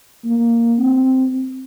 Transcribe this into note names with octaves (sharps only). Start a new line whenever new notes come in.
A#3
C4